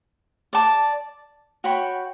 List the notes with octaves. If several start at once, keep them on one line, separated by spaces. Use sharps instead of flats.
D5 A5 D6
F#4 C#5 G5 B5